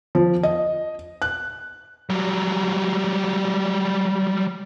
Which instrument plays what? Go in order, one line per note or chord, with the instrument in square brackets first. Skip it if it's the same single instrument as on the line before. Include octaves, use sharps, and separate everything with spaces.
[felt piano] F3
D#5
F#6
[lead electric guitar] F#3 G3